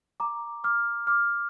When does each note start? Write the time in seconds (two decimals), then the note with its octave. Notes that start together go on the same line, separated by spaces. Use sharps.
0.20 A#5 D6
0.64 D6 F6
1.07 D6 F6